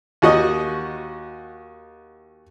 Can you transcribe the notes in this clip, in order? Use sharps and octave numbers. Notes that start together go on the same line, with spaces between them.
D#2 F#4 D#5